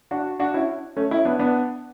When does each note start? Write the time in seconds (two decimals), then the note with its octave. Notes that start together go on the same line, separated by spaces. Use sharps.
0.11 D4 F#4
0.39 D4 F#4
0.54 C#4 E4
0.97 A3 C#4
1.11 C#4 E4
1.25 B3 D4
1.39 B3 D4